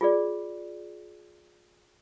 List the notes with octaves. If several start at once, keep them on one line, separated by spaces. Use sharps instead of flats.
F4 G#4 D5